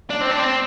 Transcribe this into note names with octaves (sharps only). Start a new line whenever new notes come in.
D4
C4
D4
C4